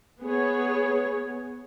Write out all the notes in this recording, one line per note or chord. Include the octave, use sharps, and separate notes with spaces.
B3 G#4 C#5